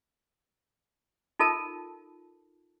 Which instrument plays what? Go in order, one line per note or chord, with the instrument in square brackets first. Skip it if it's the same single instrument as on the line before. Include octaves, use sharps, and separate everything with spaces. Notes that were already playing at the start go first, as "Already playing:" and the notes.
[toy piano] D#4 F4 A4 A#4 A5